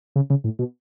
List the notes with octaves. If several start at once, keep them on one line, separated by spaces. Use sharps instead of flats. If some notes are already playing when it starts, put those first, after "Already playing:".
C#3
C#3
A2
B2